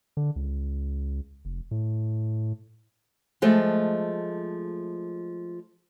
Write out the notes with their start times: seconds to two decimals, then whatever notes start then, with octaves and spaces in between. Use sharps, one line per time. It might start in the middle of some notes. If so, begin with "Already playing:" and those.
0.17 D3
0.36 C#2
1.45 F1
1.71 A2
3.42 F3 G#3 A3